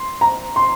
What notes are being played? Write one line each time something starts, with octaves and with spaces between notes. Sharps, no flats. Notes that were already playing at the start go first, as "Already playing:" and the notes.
Already playing: C6
A#5
C6